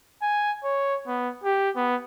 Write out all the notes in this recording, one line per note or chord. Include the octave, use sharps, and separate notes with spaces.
G#5
C#5
B3
G4
B3